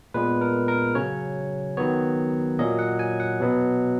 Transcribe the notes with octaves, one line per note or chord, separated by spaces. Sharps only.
A#2 G#3 B3 B4
A#4
A#4
C#3 F#3 C#4 C#5
D#3 F#3 B3 C#5
A#2 F#3 A#3 C#4 D#5
F#5
G#5
F#5
B2 F#3 B3